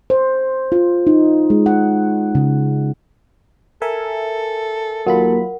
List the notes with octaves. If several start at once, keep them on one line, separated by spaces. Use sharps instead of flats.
C5
F4
D#4
G#3
F#5
C#3
A4 A#4 E5 G#5
D#2 F#3 A#3 F4 A#4 F#5 B5